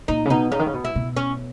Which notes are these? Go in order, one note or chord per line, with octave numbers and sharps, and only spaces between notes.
A#2 D#4
C#3
B2 D#4
C#3 D#4
D#3
C#3
B2
E4
B2
C#4